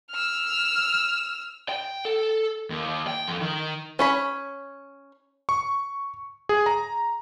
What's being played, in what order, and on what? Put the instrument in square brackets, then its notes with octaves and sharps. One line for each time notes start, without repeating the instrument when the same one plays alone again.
[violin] E6 F6
[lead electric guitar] G5
A4
D#2
G5
F2
D#3
[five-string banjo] C#4 C#5 B5
[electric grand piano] C#6
G#4
A#5